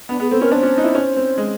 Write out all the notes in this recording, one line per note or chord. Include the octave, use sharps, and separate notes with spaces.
B3 D4
B3 G#4
C4 A4
C#4 A#4
D4 C5
C#4
D#4
E4
C#4
C4
G#3